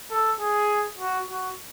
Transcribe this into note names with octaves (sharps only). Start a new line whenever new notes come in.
A4
G#4
F#4
F#4